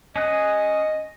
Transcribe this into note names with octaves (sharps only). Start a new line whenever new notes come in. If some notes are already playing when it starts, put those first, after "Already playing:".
C#4 G#4 D#5 F#6